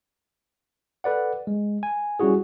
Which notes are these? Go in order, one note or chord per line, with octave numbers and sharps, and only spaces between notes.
A4 B4 D5 F#5
G#3
G#5
G3 C#4 E4 F#4 G#4